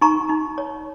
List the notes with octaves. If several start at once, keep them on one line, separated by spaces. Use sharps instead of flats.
D#4 A#5 C#6
D#4
C#5